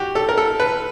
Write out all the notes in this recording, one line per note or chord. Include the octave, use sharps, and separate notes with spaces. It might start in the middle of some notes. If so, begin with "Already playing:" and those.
Already playing: F#4 G4
A4
A#4
A4
B4